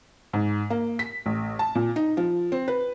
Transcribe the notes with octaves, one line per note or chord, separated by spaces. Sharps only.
G#2
A#3
B6
A1
A5
A#2
D#4
F3
C4
B4